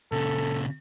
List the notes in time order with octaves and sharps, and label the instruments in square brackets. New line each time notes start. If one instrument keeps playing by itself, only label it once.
[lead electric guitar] A#2 C#3 [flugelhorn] A4